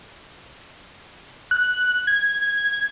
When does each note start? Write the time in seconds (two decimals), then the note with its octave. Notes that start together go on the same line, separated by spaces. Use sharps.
1.51 F#6
2.07 G#6